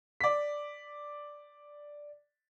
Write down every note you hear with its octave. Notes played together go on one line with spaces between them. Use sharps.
D5 B6